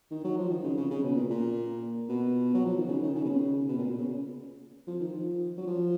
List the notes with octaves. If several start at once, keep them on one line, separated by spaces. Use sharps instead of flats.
D#3
F#3
F3
D#3
C#3
C#3
C#3
B2
A#2
A#2
B2
F#3
F3
D#3
C#3
D#3
C#3
B2
C#3
B2
A#2
B2
C#3
F3
D#3
F3
F#3
F3